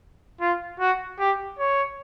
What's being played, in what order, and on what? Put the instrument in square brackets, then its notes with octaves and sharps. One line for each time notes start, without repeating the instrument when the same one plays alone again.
[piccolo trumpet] F4
F#4
G4
C#5